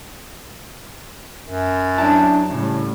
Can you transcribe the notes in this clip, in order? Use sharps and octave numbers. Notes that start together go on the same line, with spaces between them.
F#2
F#3 D4 E4 A5
A2 C#3 G3